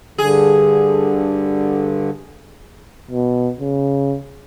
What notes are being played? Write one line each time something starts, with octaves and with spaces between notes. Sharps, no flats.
G2 D3 G#4
B2
C#3